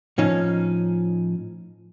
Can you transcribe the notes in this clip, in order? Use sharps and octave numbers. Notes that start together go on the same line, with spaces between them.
A2 F3 C#4 D#4